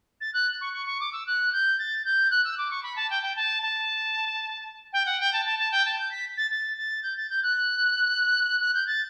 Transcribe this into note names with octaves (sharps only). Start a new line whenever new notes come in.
A6
F#6
C#6
C#6
C#6
D6
E6
F#6
G6
A6
G6
F#6
E6
D6
C#6
B5
A5
G5
G5
A5
A5
G5
F#5
G5
A5
A5
A5
G5
A5
G6
B6
A6
A6
A6
G6
A6
G6
F#6
F#6
G6
A6